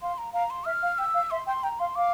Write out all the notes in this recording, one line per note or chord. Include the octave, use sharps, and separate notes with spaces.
F5 C6
A#5
F5 A#5
C6
E5 F6
F5
G5 E6
F5
E5 C6
G5 C6
G5 A#5
F5 C6
F5 D6